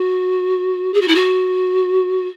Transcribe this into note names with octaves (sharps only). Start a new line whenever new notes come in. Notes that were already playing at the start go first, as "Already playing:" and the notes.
Already playing: F#4
G#4
F#4
E4
F#4